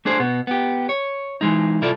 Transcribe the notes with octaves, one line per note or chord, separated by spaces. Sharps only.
A3 D4 G#4 C5
B2 B3
B3 G4
C#5
E3 G#3 D#4
C2 C3 E4 F4 A4 D5